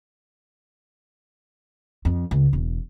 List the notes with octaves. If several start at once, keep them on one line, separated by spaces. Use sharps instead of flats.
F2
C#2
E1